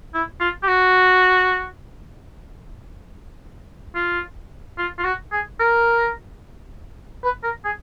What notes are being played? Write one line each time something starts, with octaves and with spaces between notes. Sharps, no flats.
E4
F4
G4
F#4
F4
F4
F4
F#4
G#4
A#4
B4
A#4
G#4